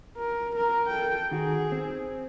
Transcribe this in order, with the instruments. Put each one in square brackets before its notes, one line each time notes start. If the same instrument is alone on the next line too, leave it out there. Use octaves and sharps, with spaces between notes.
[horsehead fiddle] A#4
A#4
A4 G5
[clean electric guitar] D#3 F#4 [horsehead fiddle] G#4
[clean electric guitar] C4